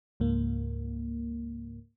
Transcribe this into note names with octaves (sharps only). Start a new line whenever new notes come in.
C#2 G#2 A#3